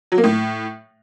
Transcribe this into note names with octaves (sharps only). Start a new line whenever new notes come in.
F#3
A#3
A2